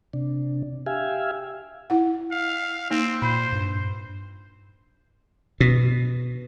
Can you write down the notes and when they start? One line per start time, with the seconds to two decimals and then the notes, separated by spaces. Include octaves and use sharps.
0.13 C3 D4
0.86 G4 E5 F5 G#5
1.90 E4 F#5
2.31 F5
2.90 A#3 C4 D#4
3.22 A#2 C5 B5
3.53 G2
5.60 B2